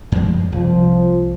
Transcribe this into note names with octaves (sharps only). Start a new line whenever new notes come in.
F#2 F3 G#3
C2 F3